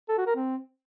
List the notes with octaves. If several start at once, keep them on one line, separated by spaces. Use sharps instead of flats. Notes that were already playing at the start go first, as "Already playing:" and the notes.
A4
F#4
A#4
C4